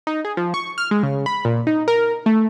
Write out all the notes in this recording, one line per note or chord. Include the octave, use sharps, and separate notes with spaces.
D#4
G#4
F3
C#6
F6
G#3
C#3
B5
A#2
D#4
A#4
A3